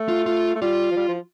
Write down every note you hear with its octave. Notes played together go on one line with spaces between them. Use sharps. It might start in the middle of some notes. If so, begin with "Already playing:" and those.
Already playing: A3
F4
F4
A3
G3 F4
F3
G3
F3